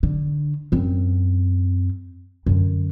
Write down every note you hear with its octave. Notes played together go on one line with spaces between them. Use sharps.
D3
F#2 C4
F#2 D3